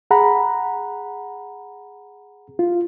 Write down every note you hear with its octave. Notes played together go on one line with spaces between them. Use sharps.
G#4 F#5 A#5 B5
F4